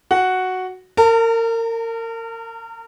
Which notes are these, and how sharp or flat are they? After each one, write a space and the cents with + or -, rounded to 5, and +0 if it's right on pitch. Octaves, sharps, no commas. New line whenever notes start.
F#4 +0 F#5 +0
A#4 -30 A5 +45